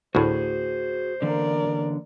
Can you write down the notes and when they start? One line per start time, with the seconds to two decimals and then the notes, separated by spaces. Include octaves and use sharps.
0.15 D2 A2 F#4 G#4 C5
1.22 D3 E3 A#3 A#4 D5